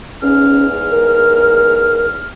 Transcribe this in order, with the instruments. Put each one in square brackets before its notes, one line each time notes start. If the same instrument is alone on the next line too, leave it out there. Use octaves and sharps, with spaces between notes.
[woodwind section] E2 G#2 F6 [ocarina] C#4
[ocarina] A#4